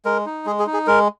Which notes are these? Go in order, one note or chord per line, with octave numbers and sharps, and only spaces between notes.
G#3 A#4
D#4
G#3 G#4
G#4
D#4
G#4
G#3 A#4